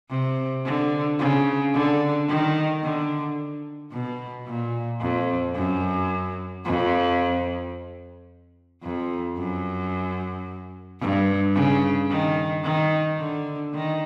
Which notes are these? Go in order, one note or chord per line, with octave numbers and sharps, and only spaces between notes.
C3
D3
C#3
D3
D#3
D3
B2
A#2
F2
F#2
F2
F2
F#2
G2
C#3
D#3
D#3
D3
D#3